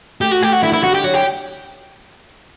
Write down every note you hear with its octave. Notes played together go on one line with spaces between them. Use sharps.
A3 G4
F#4
A3 G4
F#4
D3 E4
E4
D3 F#4
G4
F#3 F#4
G4